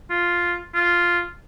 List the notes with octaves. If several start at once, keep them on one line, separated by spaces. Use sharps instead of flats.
F4
F4